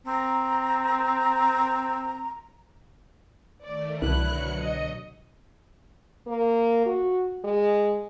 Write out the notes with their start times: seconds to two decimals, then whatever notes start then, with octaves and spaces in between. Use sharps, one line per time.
0.07 C4 A#5
3.64 D#3 A3 D5
4.02 C2 B2 D3 F#3 E4 F#6 C#7
4.59 D#5
6.27 A#3
6.86 F#4
7.45 G#3